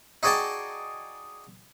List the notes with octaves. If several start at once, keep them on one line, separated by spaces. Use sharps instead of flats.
D#4 F#4 G#4 D5 G5 A5